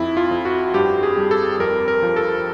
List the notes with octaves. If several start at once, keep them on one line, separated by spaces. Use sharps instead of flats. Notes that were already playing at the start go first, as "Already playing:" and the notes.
Already playing: F2 E4
F4
F2
F#4
G2 G4
G#4
G3
A4
F2 A#4
A#4
F3
A4